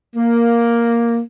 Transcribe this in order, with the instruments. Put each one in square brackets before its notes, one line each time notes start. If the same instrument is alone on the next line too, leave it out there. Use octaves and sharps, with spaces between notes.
[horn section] A#3